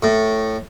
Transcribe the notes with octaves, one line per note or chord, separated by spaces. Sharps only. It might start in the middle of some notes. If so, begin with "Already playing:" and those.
A2